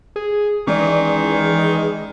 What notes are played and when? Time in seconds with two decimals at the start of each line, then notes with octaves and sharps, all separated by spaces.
0.16 G#4
0.67 D#3 E3 G#3 C#4 D5